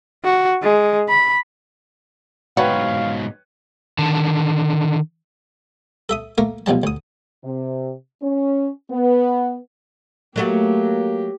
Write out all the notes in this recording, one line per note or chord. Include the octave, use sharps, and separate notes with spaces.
F#4
G#3
B5
G#2 B2 F#4 B4 C#5 F5 G5
D3 D#3 A5
A4 E5 D#6
A3 A#3 A#4
B1 B2 F3 G3 A5
D2 D#6
C3
C#4
B3
F#3 A3 A#3 F#4 G4